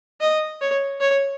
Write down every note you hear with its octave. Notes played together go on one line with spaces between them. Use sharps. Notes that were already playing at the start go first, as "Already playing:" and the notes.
D#5
C#5
C#5